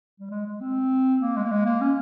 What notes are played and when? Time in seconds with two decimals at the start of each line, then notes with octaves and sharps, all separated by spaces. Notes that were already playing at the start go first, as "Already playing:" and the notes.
0.20 G3
0.31 G#3
0.46 G#3
0.61 C4
1.21 A#3
1.36 G#3
1.44 A#3
1.51 G#3
1.65 A#3
1.81 C#4